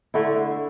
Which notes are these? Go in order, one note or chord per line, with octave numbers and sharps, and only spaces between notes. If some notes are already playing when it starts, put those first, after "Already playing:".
D3 A3 E4